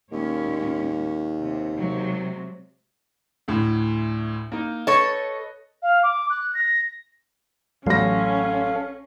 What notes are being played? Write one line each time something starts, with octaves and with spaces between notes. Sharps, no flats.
D#2 A#2 G#3 C#4
C3
C3 F#3 G#3
D2 A2
A#3 D#4
A4 B4 C#5 D#5
F5
D6
F#6
A#6
A1 F#3 C#4 A4 F5 A#6